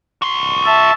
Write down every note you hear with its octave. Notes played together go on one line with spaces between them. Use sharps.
F#4 C6
E5 A5